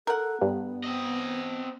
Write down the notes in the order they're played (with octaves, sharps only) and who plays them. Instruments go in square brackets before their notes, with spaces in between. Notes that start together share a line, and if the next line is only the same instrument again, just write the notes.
[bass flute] A4 [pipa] A#4 F#5
[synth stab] G2 [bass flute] B3
[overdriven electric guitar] C4 D#5